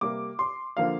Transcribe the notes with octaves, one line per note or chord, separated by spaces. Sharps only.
C3 G3 A#3 D6
C6
D3 F3 A#3 F5